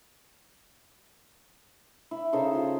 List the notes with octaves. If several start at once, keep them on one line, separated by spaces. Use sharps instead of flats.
E4
C#3 D#4 A4 C5
F4